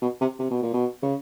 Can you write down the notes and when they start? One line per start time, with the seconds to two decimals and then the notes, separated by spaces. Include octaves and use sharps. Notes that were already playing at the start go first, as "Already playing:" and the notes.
0.02 B2
0.21 C3
0.39 C3
0.50 B2
0.62 A#2
0.73 B2
1.02 C#3